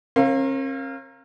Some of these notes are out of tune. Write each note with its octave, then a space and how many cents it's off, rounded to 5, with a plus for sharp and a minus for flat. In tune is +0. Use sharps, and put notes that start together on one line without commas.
C#4 -45 A#4 +0 F5 +0